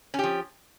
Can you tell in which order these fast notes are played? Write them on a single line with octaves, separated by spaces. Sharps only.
C#4 G4 F3